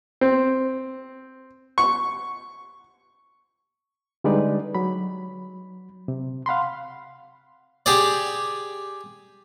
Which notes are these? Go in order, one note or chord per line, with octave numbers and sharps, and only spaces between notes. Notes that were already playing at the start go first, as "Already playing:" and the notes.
C4
C#6
D3 G3 G#3 D#4 B4 D5
F#3 B5
C3
F5 F#5 B5 C6
G4 G#4 D5